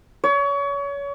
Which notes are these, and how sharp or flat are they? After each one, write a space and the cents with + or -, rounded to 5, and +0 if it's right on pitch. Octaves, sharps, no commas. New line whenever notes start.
C#5 +30